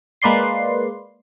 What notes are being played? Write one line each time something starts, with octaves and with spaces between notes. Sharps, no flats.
G#3 A#3 B4 D5 C6 C7